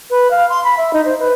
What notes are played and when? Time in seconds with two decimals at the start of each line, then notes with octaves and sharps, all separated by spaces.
0.10 B4
0.31 F5
0.49 C6
0.64 B5
0.77 E5
0.93 D#4
1.05 C5
1.20 B4